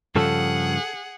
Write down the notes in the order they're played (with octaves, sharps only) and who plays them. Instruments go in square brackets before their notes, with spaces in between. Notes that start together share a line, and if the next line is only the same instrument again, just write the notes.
[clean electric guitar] G2 C#3 F3 [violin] G#4 F#5 [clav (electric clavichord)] A4